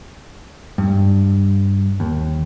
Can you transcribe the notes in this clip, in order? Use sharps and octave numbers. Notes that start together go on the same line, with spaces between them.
G2
D#2